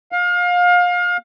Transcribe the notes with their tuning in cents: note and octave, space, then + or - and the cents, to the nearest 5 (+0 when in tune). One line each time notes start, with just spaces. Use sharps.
F5 +30